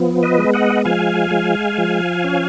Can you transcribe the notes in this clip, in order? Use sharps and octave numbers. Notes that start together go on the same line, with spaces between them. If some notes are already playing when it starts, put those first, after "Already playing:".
Already playing: F3 B3
B4 D#5
G#3
D#5 F#5
F3 F5 G#5
G#3
F3
C#4